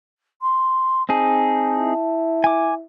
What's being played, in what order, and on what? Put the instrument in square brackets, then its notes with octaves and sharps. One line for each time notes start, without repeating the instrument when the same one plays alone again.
[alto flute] C6
[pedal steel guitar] C4 D#4 G#4 [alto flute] A5
[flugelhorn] E4
[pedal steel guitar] G#5 D6